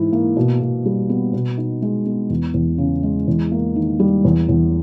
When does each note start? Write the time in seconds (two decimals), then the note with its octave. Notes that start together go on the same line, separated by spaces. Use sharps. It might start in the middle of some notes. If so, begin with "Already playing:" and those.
Already playing: G#2 E3 E4
0.12 A#3
0.37 B2
0.61 B2
0.86 G3
1.09 B3
1.33 B2
1.58 D#4
1.82 G#3
2.06 B3
2.30 E2
2.54 E2
2.78 C#3
3.03 G#3
3.28 E2
3.52 A#3
3.76 D#3
4.00 G3
4.25 E2
4.49 E2